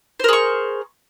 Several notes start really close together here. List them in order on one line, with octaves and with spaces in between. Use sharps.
C5 A#4 G#4 C#6